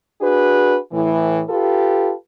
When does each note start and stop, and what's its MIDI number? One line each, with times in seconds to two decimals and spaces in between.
0.21 0.77 62
0.21 0.77 66
0.21 0.77 68
0.21 0.77 71
0.92 1.42 45
0.92 1.42 52
1.49 2.12 65
1.49 2.12 67
1.49 2.12 69
1.49 2.12 71